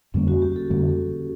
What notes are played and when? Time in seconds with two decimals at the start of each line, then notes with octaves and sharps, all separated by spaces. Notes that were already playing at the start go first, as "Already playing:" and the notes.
0.14 F2 D3 G3 A#3 C#4
0.28 F#4
0.42 G4
0.56 A4
0.70 F2 D3 G3 A#3